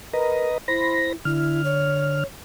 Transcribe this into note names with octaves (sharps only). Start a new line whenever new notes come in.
A#4 B4 D#5 A#5
E4 C5 B5 A#6
D3 E4 F6
C#5